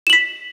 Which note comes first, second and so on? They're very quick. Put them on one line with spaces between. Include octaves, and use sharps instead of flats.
E7 F#7 B6